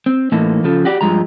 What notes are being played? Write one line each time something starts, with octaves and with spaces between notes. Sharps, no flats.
C4
A2 E3 A#3 D#4 A4
C#3 F3 A4
F#4 G4 D5
G2 F3 G#3 A#5